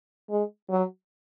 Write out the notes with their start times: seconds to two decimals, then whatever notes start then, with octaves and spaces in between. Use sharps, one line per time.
0.29 G#3
0.70 F#3